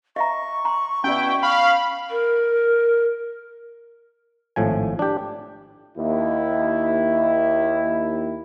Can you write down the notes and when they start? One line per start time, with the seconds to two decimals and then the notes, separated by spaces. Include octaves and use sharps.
0.16 D#5 E5 A#5 C#6
0.65 A#5 C6
1.04 B2 C#4 E4 F#4 D5 G5
1.43 F5 B5
2.11 A#4
4.56 G#1 A2 F3 G#5
4.99 D4 G4
5.98 D#2 E4